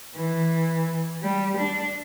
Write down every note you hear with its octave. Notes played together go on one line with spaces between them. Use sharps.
E3
G3
D4